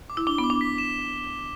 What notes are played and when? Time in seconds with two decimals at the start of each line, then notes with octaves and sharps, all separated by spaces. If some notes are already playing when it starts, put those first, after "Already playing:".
0.10 D6
0.17 E4
0.27 D4 G7
0.38 B3
0.44 D6
0.50 D4
0.61 B6
0.78 E7